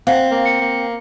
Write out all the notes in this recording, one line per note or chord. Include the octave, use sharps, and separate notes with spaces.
C4 F5 F#5
A#3
C#7
A#3